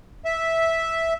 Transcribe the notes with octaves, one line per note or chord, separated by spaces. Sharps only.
E5